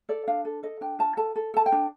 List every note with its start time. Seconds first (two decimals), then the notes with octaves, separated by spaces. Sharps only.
0.09 A4 D5
0.27 D4 F5
0.45 A4
0.63 A4 D#5
0.81 D4 G5
0.99 F4 A5
1.17 A4 A5
1.36 A4
1.54 A4 A5
1.66 G5
1.72 D4